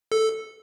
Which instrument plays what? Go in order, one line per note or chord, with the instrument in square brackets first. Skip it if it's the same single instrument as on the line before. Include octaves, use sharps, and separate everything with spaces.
[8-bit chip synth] A4